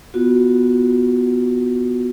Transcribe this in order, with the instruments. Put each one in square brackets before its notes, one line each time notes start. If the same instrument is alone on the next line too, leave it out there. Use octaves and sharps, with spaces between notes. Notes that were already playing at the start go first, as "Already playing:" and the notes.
[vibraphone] B3 F4 F#4